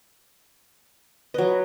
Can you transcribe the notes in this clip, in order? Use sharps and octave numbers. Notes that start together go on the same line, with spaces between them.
F#3 B4 D#5